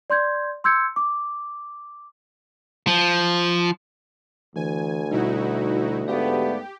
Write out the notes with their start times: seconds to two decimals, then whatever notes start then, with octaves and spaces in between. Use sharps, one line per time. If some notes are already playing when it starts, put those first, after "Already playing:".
0.10 D5 C6 G6 G#6
0.64 C6 E6 G6 G#6 C#7
0.96 D6
2.87 F3
4.56 D2 E3 G#5
5.11 B2 G3 D#4 E4 F#4
6.08 G#2 A3 B3 G4 D5 F5